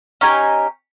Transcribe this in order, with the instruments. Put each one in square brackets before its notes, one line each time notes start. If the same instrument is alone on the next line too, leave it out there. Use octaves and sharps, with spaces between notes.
[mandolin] C#4 D#4 G4 G#5